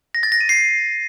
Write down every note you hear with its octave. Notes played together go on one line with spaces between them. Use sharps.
A#6
A6
A#6
D#7
C7